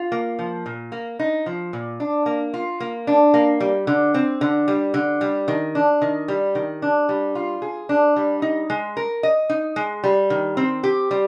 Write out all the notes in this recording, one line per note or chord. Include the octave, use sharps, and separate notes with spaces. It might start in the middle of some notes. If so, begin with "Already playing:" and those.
Already playing: F4
A#3
F3
A#2
A#3
D#4
F3
A#2
D4
A#3
F4
A#3
D4
A#3
G3
D3
C4
D3
G3
D3
G3
D#3
D4
D#3
G3
D#3
D4
G3
F4
G#4
D4
G3
D#4
G#3
A#4
D#5
D#4
G#3
G3
D#3
C4
G4
G3